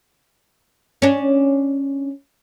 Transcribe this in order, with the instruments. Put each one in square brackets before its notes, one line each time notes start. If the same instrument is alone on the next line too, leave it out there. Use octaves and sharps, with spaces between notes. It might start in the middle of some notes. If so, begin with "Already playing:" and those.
[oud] C#4 D4